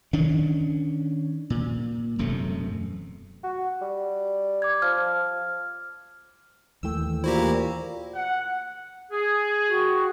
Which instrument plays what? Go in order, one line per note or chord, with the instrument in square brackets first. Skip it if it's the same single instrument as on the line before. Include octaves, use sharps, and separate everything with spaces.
[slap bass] D#3 C#4 D4
A#2
E1 F#2 C3 A3
[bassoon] F#4
G3
[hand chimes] D6 G#6
[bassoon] F3 [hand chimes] F6
[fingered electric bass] D#2 E3 A3 [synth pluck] G5 E6
[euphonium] A#2 [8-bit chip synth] E4 F#4 G4 [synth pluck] C5 A#5
[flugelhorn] F#5
[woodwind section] G#4
[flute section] F#4 G5 C#6